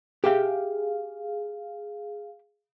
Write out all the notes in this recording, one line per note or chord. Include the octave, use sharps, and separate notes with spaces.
G4 G#4 E5 F5 G5